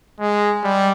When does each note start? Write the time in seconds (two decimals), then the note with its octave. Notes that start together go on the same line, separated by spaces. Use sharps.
0.20 G#3
0.64 G3